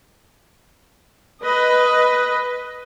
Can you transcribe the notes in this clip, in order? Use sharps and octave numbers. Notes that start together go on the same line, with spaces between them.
B4 D#5